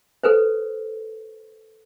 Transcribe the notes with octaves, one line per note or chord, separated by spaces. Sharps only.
A4 B4 C5